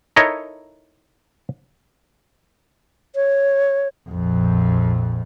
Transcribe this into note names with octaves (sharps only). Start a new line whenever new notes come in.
D#4 E4 A4 A#4 C#5 D#5
C#5
A#1 F2